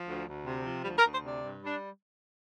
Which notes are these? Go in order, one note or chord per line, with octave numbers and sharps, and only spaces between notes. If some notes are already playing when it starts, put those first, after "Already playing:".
Already playing: F3
D2
D2
C3
F3
D2 G3
A#4
D2
C5
C3 D5
G2
G3
D4